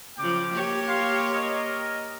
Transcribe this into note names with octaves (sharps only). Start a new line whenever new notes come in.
C#3 F3 G5 D6
A#3 G4 C#5
F5 C6
A#4 D#5